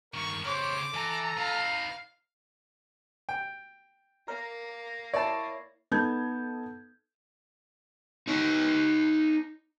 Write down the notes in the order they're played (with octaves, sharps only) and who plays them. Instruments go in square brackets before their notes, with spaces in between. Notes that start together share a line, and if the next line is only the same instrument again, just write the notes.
[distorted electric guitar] G2 D#3 [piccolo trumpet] A#4 [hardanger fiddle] C#6
[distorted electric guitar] C#3 G4 [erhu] C5 [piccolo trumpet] C#5 [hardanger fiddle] D6
[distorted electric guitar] E3 [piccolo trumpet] A4 [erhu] A#5
[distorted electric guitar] D#4 B4 [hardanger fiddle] F5
[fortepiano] G5
[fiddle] A#3 [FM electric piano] A#4
[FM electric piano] E4 C#5 [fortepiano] D5 A5
[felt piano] B3 D#4 A4 A5 G6 G#6
[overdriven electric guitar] D#4 C#5